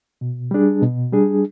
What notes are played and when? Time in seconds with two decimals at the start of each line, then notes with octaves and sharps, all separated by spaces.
0.21 B2
0.51 G3 D4 G#4
0.82 B2
1.13 G3 D4 G#4